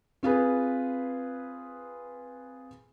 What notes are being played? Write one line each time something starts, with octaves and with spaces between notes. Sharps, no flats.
C4 F4 G#4 B4